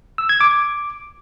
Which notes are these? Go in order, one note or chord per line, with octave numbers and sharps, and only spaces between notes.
E6
G#6
D6